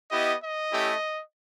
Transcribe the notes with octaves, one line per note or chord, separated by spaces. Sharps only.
B3 E4 G4 D#5
D#5
A3 C#4 E4 G4